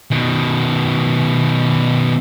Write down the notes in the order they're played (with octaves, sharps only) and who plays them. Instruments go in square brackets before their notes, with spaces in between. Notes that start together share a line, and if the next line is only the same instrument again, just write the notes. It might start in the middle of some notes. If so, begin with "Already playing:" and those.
[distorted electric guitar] B2 D#3